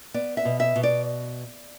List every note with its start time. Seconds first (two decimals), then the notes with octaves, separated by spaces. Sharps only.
0.14 B3 D5
0.37 E5
0.45 B2
0.60 E5
0.76 B2
0.83 D5